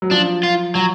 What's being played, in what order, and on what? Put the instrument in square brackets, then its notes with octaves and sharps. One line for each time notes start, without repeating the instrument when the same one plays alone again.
[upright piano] F#3
[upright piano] F3 [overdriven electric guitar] D4
[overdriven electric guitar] F4
F#3